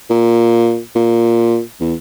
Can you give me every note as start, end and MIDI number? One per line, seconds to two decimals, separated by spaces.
0.10 0.80 46
0.95 1.61 46
1.80 1.94 40